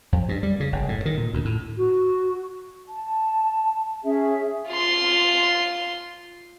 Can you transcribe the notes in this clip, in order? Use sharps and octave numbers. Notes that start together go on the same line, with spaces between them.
F2
G2
G3
C#3
F#1
A2
D#3
A#2
D2
A2
F#4
A5
C#4 G#4 E5
F4 C6